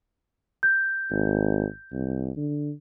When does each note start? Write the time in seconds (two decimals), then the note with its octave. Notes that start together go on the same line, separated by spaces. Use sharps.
0.63 G6
1.11 G#1
1.92 C2
2.37 D3